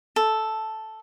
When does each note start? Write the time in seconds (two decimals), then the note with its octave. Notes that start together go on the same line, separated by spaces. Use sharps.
0.16 A4